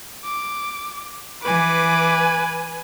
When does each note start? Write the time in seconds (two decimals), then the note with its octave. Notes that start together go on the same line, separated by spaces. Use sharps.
0.24 D6
1.42 E3 B4 G#5 D6